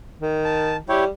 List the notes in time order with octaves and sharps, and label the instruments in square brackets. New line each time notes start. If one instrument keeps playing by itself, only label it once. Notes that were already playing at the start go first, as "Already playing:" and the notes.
[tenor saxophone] D#3
[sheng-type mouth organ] A5
[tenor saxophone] G3 [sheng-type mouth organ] E4 G4 C#5